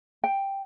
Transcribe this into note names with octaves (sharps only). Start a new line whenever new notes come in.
G5